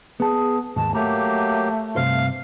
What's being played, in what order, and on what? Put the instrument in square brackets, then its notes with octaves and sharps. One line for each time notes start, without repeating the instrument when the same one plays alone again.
[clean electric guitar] B3 A5 [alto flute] G#4
[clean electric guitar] D#2 G#2 [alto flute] A5
[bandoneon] F#3 A#3 G4 [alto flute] A3 [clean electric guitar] A#5
[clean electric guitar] G2 C3 C5 [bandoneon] F5